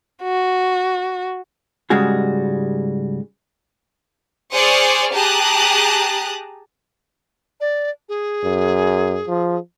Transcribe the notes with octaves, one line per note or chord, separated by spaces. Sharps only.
F#4
G#2 C#3 G3 G#3 F#4 G#4
G#4 C5 D5 C#6 D#6 F6
G4 G#4 A5 A#5 D#6 F#6
D5
G#4
F#2
F3